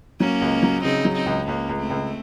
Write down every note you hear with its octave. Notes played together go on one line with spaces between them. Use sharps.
F#3 A#3 C#4
C#2
F#3
C#3 C4 D#4
F#3
C4 D#4
C#2
C#2 A#3 C#4
C#2
A3 C4
C#2